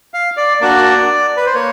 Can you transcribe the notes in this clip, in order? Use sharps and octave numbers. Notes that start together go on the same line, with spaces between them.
F5
D5
A#3 D4 F#4 D5
B4
C5
A#3 C#5